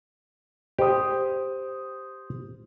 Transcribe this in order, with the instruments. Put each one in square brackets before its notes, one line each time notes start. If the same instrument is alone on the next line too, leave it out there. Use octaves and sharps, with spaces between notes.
[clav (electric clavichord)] G4 [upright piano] C5 D#6